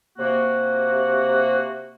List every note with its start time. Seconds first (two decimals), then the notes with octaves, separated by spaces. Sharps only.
0.18 C3 A#3 F#4